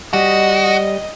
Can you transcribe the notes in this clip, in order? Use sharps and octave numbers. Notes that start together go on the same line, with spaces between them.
G3 F#4 D#5